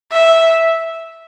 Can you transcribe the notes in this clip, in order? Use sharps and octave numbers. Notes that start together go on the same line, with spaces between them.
E5